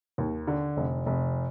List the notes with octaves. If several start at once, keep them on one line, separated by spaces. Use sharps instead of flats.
D#2
D3
F1
F1